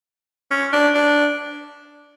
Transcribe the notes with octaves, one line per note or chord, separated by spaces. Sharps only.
C#4
D4
D4